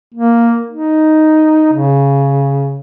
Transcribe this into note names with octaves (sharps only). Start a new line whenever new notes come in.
A#3
D#4
C#3